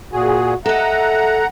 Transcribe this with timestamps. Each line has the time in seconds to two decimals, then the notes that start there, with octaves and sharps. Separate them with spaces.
0.13 A#2 F#4 G#4
0.66 A4 D#5 E5 F#5 A#5